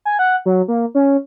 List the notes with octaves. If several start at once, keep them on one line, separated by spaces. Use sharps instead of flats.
G#5
F#5
F#3
A#3
C#4